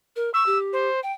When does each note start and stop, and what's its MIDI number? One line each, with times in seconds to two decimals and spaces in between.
0.16 0.32 70
0.34 0.43 85
0.34 0.58 88
0.46 0.89 67
0.73 1.00 72
1.03 1.12 79